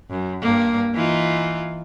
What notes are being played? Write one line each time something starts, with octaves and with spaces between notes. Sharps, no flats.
F#2
G2 A#3
E3 D#4 F4